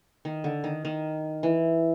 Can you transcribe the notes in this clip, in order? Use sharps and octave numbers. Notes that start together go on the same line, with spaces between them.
D#3
D3
D#3
D#3
E3